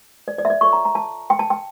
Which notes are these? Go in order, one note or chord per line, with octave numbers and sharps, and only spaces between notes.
D5
D5
E5
D5
F4 A4 C#5 C#6
A#5
A#5
A5
G5
A5
G5